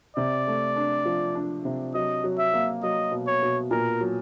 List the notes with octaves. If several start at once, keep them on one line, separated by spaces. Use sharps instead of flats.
C3 D5
A3
D4
F3
D4
C3
F#3 D#5
F#3
E5
A#3
F#3 D#5
B2
C#5
B2
A#2 A#4
F#3